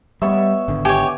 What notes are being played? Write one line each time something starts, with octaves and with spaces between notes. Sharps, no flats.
G3 B3 C#5 E5
G#1 D3
G4 C#5 G#5